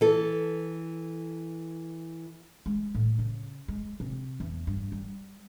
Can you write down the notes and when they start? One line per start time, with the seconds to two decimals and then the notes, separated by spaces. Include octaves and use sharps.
0.01 E3 A4
2.66 G#3
2.95 A2
3.19 C#3
3.68 G#3
4.00 C3
4.40 E2
4.67 G2
4.92 G3